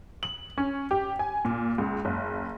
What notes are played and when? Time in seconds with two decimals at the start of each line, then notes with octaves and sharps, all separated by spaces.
0.23 F#7
0.58 C#4
0.91 G4
1.19 G#5
1.45 A#2
1.78 C#2
2.05 F#1